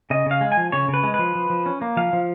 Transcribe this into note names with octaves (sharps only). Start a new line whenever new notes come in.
C#3 D#5
C#3 F5
G#3
G#5
F3
C#3 C#5
C#3
B4
G#3
F3 B4
F3
F3
C#4
A#3
F3 F5
F3